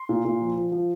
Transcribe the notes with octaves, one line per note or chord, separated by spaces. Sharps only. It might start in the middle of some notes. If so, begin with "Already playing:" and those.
Already playing: C6
A#2
A#2
F3
F3
F3